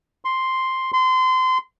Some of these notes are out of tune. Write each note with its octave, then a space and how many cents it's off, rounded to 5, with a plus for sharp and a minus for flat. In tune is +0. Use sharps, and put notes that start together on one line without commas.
C6 +0
C6 -25